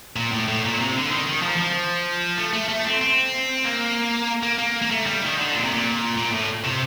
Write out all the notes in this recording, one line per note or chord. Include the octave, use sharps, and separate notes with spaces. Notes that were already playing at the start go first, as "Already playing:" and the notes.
A#2
A2
A2
A#2
C3
D3
D#3
D#3
F3
F3
A3
A3
A3
C4
C4
A#3
A#3
A#3
A#3
A3
G3
D#3
D3
A#2
C3
A#2
A#2
A2
C3